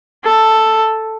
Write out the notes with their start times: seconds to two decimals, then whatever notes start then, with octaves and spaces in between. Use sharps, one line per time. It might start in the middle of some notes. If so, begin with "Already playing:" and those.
0.24 A4